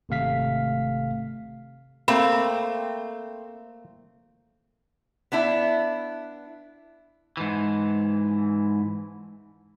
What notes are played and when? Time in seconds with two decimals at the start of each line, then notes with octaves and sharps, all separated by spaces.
0.09 G#1 C3 A3 F5 B6
2.08 A3 A#3 C4 B5
5.32 B3 D4 E4
7.37 G#2 E3